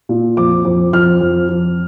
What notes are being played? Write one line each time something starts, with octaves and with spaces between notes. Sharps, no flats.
A#2
F2 D6
F2
F2 F6
F2
F2